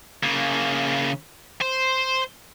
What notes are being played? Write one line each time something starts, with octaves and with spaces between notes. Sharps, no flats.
C#3 A#3
C5